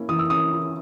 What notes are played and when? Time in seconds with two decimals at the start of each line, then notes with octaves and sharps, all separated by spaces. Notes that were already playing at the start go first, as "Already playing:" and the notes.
Already playing: A#3 C#4 E4
0.09 E3 D#6
0.19 E6
0.30 C#4 D#6
0.53 E4